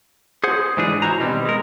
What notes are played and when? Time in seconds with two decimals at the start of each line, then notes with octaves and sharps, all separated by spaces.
0.44 G#4 C5 F#5
0.77 G#2 E3 D4 G#4
1.02 E4 F#4 C5 A#5
1.20 B2 D#3 G3 C4
1.45 G#3 A#4